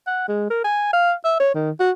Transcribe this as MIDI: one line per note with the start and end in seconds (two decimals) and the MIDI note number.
0.07 0.28 78
0.28 0.49 56
0.50 0.63 70
0.64 0.88 80
0.93 1.13 77
1.25 1.35 76
1.40 1.51 73
1.54 1.71 51
1.80 1.91 66